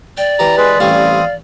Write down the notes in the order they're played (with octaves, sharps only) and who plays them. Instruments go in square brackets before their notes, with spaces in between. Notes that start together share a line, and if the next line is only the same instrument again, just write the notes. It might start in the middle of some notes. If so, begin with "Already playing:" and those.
[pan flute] D5 [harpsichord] G5
[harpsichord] E3 G4 [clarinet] A#5
[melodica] G#3 G#4 [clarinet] B4
[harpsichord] A1 G3 C#4 [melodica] C4 D#6 [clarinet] F5